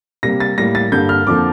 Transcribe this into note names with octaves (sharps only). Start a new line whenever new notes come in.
C3 G3 A#3 A#6
A6
A2 G3 A#3 A#6
A6
G2 D3 G3 A#3 G6
F6
F2 D3 F3 A#3 D6